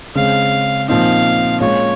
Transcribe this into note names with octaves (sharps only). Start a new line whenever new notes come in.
C#3 G#3 C4 F5
A#2 F3 C4 D#4 F5
A#2 G#3 C#4 F4 C#5